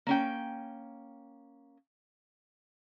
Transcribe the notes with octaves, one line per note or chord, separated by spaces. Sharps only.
A#3 C#4 G5